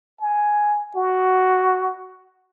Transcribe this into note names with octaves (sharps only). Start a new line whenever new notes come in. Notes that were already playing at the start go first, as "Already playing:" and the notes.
G#5
F#4